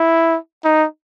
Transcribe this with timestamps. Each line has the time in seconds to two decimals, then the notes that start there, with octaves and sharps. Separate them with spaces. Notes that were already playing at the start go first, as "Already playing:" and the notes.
Already playing: E4
0.64 D#4